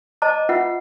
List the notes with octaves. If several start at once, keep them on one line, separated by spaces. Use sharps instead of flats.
C5 D#5 A5 A#5 D6
F4 B4 E5 F#5